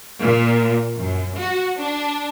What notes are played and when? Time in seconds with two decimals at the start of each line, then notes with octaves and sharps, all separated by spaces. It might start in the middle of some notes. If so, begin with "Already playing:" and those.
0.22 A#2
0.97 F#2
1.36 F#4
1.79 D4